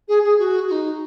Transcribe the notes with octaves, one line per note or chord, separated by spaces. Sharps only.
G#4
G#4
F#4
F#4
D#4